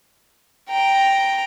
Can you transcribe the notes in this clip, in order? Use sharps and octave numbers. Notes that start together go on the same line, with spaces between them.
G5 A#5